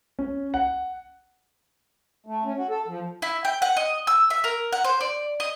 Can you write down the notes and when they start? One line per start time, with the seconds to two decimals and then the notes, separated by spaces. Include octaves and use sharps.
0.19 C#4
0.54 F#5
2.26 A3
2.44 C#4
2.58 F#4
2.70 A4
2.88 F3
3.22 E4
3.45 G5
3.62 F#5
3.77 D#5
4.07 E6
4.30 E5
4.44 A#4
4.73 F#5
4.84 C5
5.01 D5
5.40 D#5